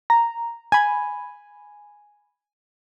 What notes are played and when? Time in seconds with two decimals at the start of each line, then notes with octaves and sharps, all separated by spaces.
0.10 A#5
0.72 G#5 B5